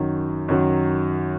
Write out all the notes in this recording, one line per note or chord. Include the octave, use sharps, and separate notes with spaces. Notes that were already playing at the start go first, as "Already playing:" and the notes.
Already playing: F#2 D#3 F#3
F#2 D#3 F#3